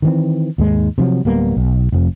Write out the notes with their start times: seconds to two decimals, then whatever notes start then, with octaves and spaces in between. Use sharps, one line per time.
0.02 D#3 E3 C4
0.58 D#2 G#2 G#3
0.98 C3 F3 F#3
1.25 D1 G3 A#3 B3
1.57 B1
1.92 F1 F2 F3